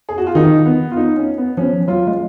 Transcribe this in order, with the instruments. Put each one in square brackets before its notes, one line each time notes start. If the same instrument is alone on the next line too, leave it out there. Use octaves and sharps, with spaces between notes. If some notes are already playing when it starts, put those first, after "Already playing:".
[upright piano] G#4
F#4
F4
[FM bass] D#3 [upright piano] D#4
[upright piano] B3
F4
D#4
C#4
B3
[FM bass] F3 [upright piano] C#4
[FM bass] F#3 [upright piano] F4
[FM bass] G#3